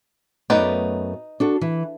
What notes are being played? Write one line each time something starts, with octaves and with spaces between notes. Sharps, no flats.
F#2 A3 B3 D#4 B4 D5
D4 F#4 A4
E3